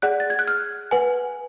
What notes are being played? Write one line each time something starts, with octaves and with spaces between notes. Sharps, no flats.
G#4 D5 F#5 F#6
A6
G#6
F#6
F6
B4 F#5 G#5